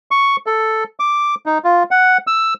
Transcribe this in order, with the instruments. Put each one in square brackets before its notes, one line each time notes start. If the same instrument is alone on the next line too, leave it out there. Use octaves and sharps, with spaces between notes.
[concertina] C#6
A4
D6
D#4
F4
F#5
E6